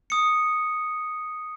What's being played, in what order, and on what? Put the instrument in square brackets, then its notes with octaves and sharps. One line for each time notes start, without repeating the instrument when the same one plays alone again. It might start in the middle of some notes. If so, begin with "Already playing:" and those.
[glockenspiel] D#6 C#7